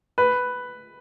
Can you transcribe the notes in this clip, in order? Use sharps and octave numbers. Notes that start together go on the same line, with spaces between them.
B4